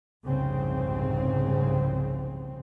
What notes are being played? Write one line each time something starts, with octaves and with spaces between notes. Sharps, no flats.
F1 C2 G#2 C#3 C4